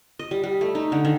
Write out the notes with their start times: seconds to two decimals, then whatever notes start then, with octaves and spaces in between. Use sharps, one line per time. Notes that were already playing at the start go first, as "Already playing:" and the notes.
0.19 D#5
0.31 G3
0.44 G3
0.61 A3
0.75 D#4
0.92 D3
1.05 D#3